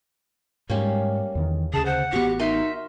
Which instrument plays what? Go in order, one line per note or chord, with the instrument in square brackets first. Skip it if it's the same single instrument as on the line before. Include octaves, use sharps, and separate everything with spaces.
[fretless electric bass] G#2 G#3 [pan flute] G3 [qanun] A#3 C#4 G4
[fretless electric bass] E2 D#3
[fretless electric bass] D2 C#3 [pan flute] G#4 [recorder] A5
[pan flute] C5 [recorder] F#5
[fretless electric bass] A1 B3 [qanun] F#4 C#6 [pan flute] G4
[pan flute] D#4 [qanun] A#4 D#5 C6 [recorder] E5